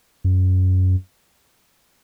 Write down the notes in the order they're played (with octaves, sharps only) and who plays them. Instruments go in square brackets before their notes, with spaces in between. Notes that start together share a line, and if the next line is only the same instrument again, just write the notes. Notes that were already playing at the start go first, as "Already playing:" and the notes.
[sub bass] F#2